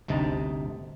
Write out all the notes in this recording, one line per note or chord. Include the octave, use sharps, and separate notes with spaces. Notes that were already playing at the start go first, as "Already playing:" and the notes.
G1 D2 C3 D#4 A5